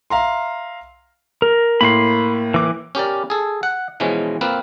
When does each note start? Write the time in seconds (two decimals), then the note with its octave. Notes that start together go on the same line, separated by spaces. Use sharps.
0.10 E5 F5 A#5 C6
1.42 A#4
1.81 A2 A#3 B5 C6
2.54 E3 D6
2.95 C#4 G4 A#4 D5
3.30 G#4 A4
3.63 F#5
4.00 B2 E3 F3 G#3 C#4
4.41 A#3 C4 F4 B4